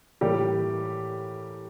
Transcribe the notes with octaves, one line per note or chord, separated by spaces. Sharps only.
A2 E3 G3 A#3 G4